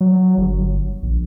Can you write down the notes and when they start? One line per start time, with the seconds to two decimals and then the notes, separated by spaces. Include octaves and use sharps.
0.01 F#3
0.37 G1
1.03 A#1